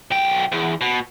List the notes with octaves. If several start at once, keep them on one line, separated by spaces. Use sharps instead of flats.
B1 G5
E2
B2